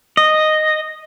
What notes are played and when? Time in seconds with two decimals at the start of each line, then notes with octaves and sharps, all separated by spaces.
0.17 D#5